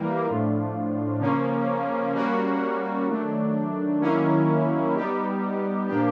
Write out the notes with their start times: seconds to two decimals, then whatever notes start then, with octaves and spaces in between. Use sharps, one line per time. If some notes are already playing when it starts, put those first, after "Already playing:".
Already playing: E3 G3 A#3
0.26 A2 F3 A3 D4 F4
1.20 C#3 F3 A#3 C#4
2.14 G3 A#3 C#4 F#4
3.07 D#3 F#3 A3 D4
4.01 D#3 F#3 A#3 C#4 E4
4.94 G3 B3 D#4 G4
5.88 A#2 F3 A#3 D4 G4